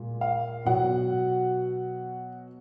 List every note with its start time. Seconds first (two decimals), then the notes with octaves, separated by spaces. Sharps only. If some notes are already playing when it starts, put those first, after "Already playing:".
Already playing: A#2 G#3
0.21 F5
0.65 B2 F#3 F#5